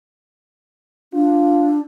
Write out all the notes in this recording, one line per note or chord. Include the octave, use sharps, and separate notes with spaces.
D4 F4